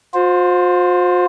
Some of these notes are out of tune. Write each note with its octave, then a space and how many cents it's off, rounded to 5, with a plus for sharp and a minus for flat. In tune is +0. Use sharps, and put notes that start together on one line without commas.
F4 +45 C5 +0